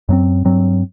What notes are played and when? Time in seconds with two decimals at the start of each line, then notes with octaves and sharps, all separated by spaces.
0.09 F#2 F#3 A3 C4
0.45 G2 F#3 C4